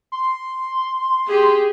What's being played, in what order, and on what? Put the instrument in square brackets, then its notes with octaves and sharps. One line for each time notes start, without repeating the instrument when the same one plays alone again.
[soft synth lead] C6
[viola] G4 G#4